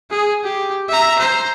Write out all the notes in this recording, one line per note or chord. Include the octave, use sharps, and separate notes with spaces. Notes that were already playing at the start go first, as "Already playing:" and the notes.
G#4
G4
E5 A#5
C5 A#5